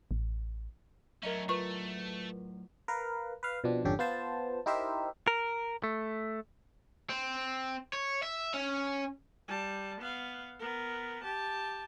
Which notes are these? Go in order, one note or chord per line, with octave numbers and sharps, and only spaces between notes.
A1
A2 F#3 A3 C#4 A#4 D#5 E5 A#5
A3 F4 A#4 B4 C#6
A#4 B4 F5
B4 F5
B2 F3 C4 D4
G#1 F2 D3 C#4 G4 A4
B3 F4 C5 A5
D#4 E4 G4 A#4 C5 E5
A#4
A3
C4
C#5
E5
C#4
G3 A5
B3 F5
B3 A#4
G4 A5